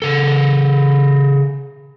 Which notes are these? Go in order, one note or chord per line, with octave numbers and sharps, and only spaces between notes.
C#3 A4